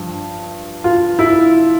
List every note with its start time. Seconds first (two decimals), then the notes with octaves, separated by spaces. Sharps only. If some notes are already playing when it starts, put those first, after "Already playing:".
Already playing: G2 F3
0.84 F4
1.19 E4